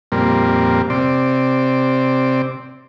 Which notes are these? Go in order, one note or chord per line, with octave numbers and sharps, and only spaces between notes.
F2 A#2 G3 A#3 C4
C3 C4 D5